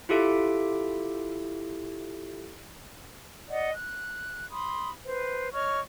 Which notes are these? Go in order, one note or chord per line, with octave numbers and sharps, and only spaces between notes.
E4 F4 G4 A4 E5 D7
D5 D#5 F#5
F#6
B5 C6 D#6
B4 C5
C#5 D#5 C#6 F6